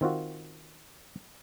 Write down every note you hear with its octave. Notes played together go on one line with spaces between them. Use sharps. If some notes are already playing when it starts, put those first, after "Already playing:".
D#3 C4 F4 F#4